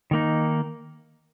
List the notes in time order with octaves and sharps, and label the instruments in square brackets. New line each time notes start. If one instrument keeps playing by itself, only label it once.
[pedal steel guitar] D#3 A#3 D#4